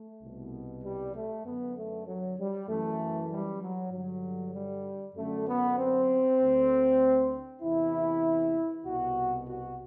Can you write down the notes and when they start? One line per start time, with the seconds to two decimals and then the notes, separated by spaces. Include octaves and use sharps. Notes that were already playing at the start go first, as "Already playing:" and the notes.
Already playing: A3
0.22 C2 B2
0.84 G3
1.15 A3
1.45 F#2 D3 B3
1.76 A3
2.07 F#3
2.38 G3
2.68 F#2 E3 A3
3.31 G3
3.61 F#3
3.92 G2 D3 F#3
4.54 G3
5.15 F#2 D3 A3
5.47 B3
5.77 C4
6.39 D2 D3
7.62 E2 C3 E3 E4
8.86 C2 B2 F#4
9.48 F#4